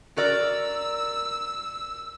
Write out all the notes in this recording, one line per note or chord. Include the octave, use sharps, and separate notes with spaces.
F#4 A#4 D5 E6